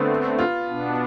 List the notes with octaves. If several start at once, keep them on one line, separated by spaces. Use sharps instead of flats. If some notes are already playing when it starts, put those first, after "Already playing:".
Already playing: D3 A3 B3 C4
F4
B2 B3 D4